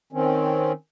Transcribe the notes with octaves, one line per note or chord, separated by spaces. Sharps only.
D#3 C4 C#4